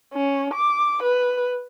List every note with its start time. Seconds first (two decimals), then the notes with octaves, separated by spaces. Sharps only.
0.14 C#4
0.54 D6
1.03 B4